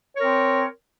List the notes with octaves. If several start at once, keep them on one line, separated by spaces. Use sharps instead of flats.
C4 A#4 C#5